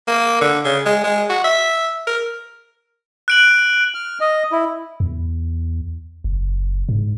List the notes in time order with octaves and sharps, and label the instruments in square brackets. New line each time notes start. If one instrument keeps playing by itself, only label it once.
[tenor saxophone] A#3
D3
C#3
G#3
G#3
F#4
E5
A#4
[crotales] F#6 D7 F#7
[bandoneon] F6
D#5
E4
[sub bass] E2
F#1
G#2